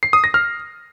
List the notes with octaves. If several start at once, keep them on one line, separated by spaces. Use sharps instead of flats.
C7
D#6
A#6
F6